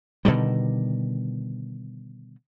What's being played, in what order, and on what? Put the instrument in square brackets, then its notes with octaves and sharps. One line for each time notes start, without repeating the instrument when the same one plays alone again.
[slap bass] B2 D3 D#3 G3